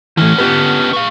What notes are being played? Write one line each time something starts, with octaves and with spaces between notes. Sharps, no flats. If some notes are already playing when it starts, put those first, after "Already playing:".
D3 E3 A3 C#4
B3 G4 B4
A3 F5